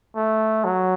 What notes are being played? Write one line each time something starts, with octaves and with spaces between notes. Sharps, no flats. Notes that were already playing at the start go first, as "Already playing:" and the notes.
A3
F#3